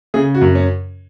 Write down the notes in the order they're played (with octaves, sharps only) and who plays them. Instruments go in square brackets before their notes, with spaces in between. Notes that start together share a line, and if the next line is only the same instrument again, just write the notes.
[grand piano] C#3 G#4
F#4
F#2
C#4